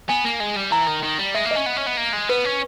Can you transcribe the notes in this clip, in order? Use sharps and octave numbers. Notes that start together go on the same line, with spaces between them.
B3 G#5
A#3
G#3
G3
E3 A#5
D#3
D#3
G3
G#3 E5
A#3
D#5
C#4
B3
C#4
B3
A#3
G#3
B3 B4
C#4